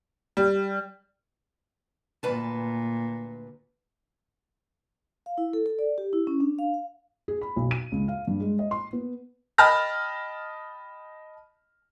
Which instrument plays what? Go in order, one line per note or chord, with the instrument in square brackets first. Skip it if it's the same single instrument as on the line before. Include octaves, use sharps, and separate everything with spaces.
[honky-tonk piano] G3
[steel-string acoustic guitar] D2 B4 A5 [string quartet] A#2
[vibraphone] F5
E4
A4
A4
D5
G4
E4
C#4
D4
F5
F5
[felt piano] G#4
B5
B1
D#7
C#2
F5
G2
G#3
D#5
C6
B3
[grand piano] D#5 G5 A5 B5 F6 A#6